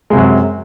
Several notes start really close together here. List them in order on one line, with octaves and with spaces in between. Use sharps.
G#3 C3 F#2 F#3